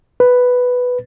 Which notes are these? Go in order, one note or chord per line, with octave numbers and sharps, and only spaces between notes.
B4